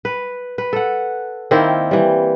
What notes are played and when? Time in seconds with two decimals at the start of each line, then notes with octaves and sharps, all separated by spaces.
0.05 B4
0.58 B4
0.73 A4 F#5
1.51 D#3 A#3 C4 E4
1.91 E3 G3